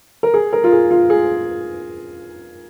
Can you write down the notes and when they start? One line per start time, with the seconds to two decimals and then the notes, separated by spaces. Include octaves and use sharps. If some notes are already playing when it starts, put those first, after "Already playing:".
0.23 A#4
0.34 G#4
0.53 A#4
0.64 F4
0.72 G#4
0.91 F4
1.10 G#4